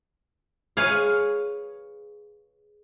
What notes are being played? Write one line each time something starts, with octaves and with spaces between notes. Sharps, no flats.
G#4 B4 C#5 F5